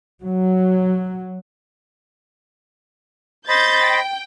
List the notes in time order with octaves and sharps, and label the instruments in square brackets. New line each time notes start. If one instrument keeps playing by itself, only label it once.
[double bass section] F#3
[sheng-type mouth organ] C5 D#5 B5 [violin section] G6 A6
[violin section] G5